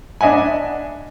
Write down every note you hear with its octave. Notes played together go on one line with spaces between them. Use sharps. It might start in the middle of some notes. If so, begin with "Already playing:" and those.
D4 D#5 E5 F#5 G#5